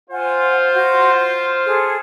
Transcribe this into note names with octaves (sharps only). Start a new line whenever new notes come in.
F4 C5 F#5 G#5
F#4 G6
C6
G#4 A4